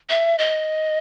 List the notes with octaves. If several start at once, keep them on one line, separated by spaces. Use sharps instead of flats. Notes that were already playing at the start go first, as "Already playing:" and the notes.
E5
D#5